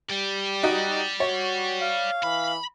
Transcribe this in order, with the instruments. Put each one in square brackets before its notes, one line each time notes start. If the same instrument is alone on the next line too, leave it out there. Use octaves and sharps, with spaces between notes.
[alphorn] G3 [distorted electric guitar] D5 G5
[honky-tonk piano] D#4 F#4
[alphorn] F#4 [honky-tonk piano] C#5
[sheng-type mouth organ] F5
[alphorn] E3 [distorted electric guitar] B5